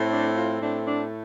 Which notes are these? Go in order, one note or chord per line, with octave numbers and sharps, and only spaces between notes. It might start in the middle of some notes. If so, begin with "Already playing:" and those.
Already playing: A2 A3 C4
D4
F4
A2 A3 C4 D4
D4